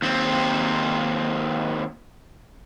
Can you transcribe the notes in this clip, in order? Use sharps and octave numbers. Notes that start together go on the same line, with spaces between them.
D#2 C4